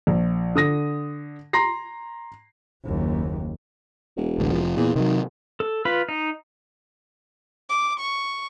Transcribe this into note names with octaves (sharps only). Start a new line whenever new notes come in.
A#1
D3 D#6 A#6
A#5 C6 A#6 C7
F#1 D#2
E1
A1 D2
F1 F3
E2 A#2
C3 D#3 F#3
A4
F4 B4 B5
D#4
D6
C#6